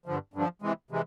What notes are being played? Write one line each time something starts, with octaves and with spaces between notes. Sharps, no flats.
G2 D3 F3
G2 D3 F3
C3 E3 G#3
C3 E3 G#3